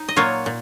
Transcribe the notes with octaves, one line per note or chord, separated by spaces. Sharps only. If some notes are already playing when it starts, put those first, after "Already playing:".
Already playing: D#4
D#5
A#2 F#3 A#3 F4 C#5
A#2